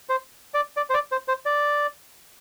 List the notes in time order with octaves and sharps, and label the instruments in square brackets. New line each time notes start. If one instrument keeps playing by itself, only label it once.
[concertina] C5
D5
D5
C5
D5
C5
C5
D5